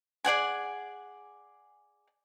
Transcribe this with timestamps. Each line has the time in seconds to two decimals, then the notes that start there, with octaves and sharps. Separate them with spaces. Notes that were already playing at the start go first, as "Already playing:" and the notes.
0.24 G#4 D5 F#5 G#5